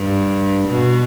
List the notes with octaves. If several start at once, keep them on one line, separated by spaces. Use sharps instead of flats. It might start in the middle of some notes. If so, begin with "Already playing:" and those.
Already playing: G2
B2